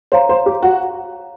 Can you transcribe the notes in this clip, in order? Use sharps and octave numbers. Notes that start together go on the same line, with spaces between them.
C5 C#5 F5 A#5
C5
G4
F#4